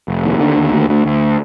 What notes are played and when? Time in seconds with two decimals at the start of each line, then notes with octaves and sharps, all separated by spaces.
0.08 F1
0.24 D#2
0.40 D3
0.56 D#2
0.72 D2
0.89 D2
1.05 D2